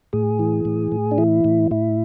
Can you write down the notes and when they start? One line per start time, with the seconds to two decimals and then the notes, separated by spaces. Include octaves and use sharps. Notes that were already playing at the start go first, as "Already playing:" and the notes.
0.13 A2 G#4
0.39 E3
0.65 A2
0.92 A2
1.11 D4
1.18 E3 E4
1.44 A2
1.71 A2 E4